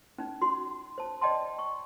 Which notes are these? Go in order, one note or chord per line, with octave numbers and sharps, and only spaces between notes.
C#4 D#4
F#4 C6
C5 A5
D5 D#5 G5 A5 C6
C#6